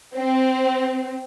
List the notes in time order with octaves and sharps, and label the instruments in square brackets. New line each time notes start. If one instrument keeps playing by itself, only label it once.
[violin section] C4